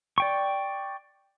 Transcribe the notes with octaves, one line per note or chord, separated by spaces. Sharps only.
D5 G5 C#6